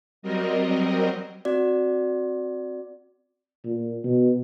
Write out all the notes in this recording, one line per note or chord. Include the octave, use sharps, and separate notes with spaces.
F#3 G3 C4 A#4 D#5
C4 F#4 D5
A#2
B2